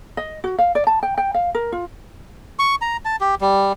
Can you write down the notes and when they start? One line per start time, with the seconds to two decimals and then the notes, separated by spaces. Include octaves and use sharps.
0.17 D#5
0.44 F#4
0.59 F5
0.75 D5
0.87 A5
1.03 G5
1.18 G5
1.34 F5
1.55 A#4
1.72 F4
2.59 C#6
2.82 A#5
3.05 A5
3.21 G4
3.41 G3